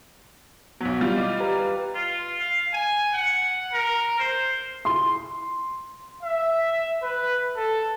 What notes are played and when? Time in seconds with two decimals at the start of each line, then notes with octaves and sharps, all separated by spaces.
0.81 B1 F#3 B3 B6
1.01 E3 G3 F4
1.17 D#5 D6
1.40 G4 B4 A#5
1.95 F4
2.40 F5
2.74 G#5
3.14 F#5
3.73 A#4
4.20 C5
4.85 C6
6.23 E5
7.03 B4
7.56 A4